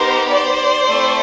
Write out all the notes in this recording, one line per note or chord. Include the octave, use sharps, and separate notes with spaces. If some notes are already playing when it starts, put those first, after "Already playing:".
Already playing: B3 D#4 G4 A#4 C5
C5 D5
A3 C4 E4 A4